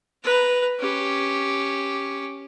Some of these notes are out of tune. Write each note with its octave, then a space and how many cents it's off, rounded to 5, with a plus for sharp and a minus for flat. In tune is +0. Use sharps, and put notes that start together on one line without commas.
B4 +0 A#5 +0
C#4 +0 G4 +0